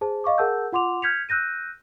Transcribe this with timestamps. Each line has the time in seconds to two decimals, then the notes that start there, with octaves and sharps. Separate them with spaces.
0.01 G#4 C5 A5
0.24 D#5 F5 C#6 D6
0.38 G#4 A#4 F#5 A5 E6 G6
0.72 F4 F#5 C6 D6 F7
1.02 F6 G6 G#6 B6 C#7 F7
1.29 E6 F#6 G6 A#6 D#7